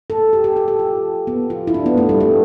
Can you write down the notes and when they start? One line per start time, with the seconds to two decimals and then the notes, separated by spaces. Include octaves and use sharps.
0.10 A4
0.33 G4
0.44 G4
0.56 A4
0.68 G4
0.79 F4
1.27 B3
1.50 F4
1.67 E4
1.74 D4
1.86 B3
1.97 A3
2.09 G3
2.20 A3